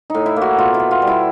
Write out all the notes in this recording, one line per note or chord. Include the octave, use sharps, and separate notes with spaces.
A2 D#4
E4
A#3
F#4
B2 F4
E4
B3
F4
G3
E4